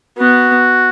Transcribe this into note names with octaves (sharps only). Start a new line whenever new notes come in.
B3 F#4